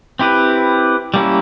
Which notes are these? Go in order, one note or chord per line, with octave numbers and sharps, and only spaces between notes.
C4 E4 G4 B4
G3 A#3 C#4 E4